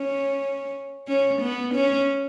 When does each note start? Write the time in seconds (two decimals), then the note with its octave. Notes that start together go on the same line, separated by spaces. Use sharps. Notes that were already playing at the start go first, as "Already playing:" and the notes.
Already playing: C#4
1.08 C#4
1.41 B3
1.74 C#4